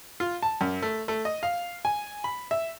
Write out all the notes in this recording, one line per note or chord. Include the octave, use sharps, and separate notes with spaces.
F4
A5
F#2
A3
A3
D#5
F5
G#5
B5
E5